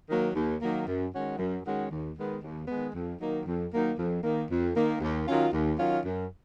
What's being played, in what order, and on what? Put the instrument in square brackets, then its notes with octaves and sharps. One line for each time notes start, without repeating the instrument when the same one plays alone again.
[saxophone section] D#3 F#3 A#3
D#2
D#3 F#3 A#3
F#2
D#3 G#3 C#4 F#4
F#2
D#3 G#3 C#4 F#4
D#2
D#3 G#3 B3
D#2
D#3 G#3 B3
F2
D#3 F#3 A#3 D#4
F2
D#3 F#3 A#3 D#4
F2
D#3 A#3
F2
D#3 A#3
D#2
D#3 F#3 C#4 F4
D#2
D#3 F#3 C#4 F4
F#2